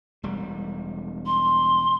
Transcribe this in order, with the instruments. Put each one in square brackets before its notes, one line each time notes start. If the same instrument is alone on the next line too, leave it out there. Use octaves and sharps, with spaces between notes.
[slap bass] E1 G3
[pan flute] C6